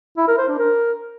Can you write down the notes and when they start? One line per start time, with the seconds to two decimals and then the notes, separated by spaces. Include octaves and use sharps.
0.17 E4
0.28 A#4
0.38 C5
0.48 D4
0.58 A#4